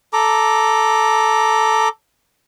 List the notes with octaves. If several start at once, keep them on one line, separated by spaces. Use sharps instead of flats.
A4 A#5 D6